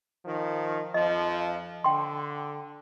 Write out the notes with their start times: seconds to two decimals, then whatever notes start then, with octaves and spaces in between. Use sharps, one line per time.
0.25 D#3 F3
0.94 F2 F3 D#5
1.84 D3 G5 C6